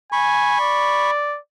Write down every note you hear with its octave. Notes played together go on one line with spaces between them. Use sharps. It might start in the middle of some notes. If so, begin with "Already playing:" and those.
G#5 B5 C#6
D5